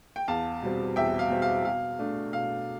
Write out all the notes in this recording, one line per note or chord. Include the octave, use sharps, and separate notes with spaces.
G5
E2 F5 A5
B2 G3 C4
E2 E5 G5
F5
B2 G3 C4
F5
B2 F5
A3 D4
B2 F5